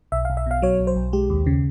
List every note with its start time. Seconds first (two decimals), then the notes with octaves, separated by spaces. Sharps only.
0.12 B1 E5
0.25 F5
0.30 B1
0.37 E5
0.46 B2 F5
0.62 F#3 C#5
0.80 B1
0.87 C5
0.96 B1
1.13 G#3 G4
1.30 D#2
1.46 C#3